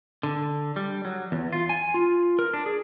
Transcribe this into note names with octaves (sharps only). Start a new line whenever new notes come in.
D3
G3
F#3
E2
F4
G#5
F4
A#4
D4
G#4